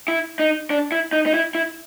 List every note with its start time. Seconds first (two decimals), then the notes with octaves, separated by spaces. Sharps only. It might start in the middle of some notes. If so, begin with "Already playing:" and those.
0.08 E4
0.39 D#4
0.70 D4
0.92 E4
1.13 D#4
1.26 D#4
1.34 E4
1.55 E4